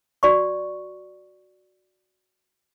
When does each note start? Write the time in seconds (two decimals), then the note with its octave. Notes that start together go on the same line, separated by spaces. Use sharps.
0.23 F#4 D5 C#6